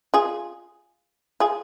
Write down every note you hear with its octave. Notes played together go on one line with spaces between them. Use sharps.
F4 G#4
F4 G#4